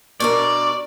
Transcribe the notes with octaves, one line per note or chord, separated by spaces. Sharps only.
B2 D4 A#4 D5 C#6